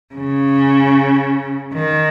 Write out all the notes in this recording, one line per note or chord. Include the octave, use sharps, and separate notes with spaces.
C#3
D#3